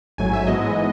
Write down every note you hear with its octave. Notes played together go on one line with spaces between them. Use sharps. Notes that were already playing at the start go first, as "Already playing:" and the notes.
A1 G#2 F#3 A3 G#5
E5
G#2 E3 G#3 B3 D#5